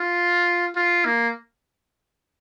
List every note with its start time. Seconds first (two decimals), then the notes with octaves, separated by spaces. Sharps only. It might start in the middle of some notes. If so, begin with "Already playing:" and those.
Already playing: F4
0.76 F4
1.05 A#3